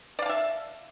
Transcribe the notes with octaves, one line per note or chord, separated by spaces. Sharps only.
D5 E5 F5 A5